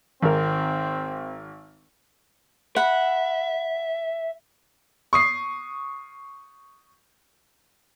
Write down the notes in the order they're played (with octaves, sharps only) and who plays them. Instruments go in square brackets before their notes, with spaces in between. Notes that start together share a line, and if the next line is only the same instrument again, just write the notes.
[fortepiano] G#1 A#4 [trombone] C4
[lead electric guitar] E5 [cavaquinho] F#5 B5
[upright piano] C#6 D#6 C7